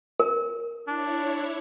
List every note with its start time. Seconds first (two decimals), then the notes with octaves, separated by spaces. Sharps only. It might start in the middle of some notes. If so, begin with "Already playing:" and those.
0.20 A#4
0.88 D4 E4 C#5